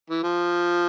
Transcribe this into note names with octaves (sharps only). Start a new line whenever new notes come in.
E3
F3